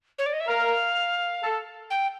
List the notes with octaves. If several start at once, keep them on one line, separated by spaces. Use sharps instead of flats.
C#5
D5
D#5
E5
A#4 F5
A4
G5